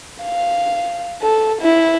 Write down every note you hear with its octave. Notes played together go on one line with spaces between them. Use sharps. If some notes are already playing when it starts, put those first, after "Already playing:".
F5
A4
E4